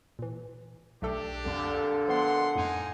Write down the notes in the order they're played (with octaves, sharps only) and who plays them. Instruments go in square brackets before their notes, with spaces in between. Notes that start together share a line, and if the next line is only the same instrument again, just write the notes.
[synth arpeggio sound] A#2 E3
[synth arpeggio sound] B1 A3 A4 [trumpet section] D4 G4
[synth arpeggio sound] C2 F2 [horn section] A#2 D3
[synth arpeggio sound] F3 B3 [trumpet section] G#3 C6 [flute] F#5
[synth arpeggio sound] F2 A2 [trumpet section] A#3 D#4 G#5